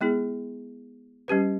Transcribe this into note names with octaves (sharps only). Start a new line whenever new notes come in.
G#3 B3 E4 G#4
G3 C#4 G4 B4